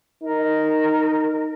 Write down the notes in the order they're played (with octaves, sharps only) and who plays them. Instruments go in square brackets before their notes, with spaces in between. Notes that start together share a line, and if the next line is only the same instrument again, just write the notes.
[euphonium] D#4 [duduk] A#4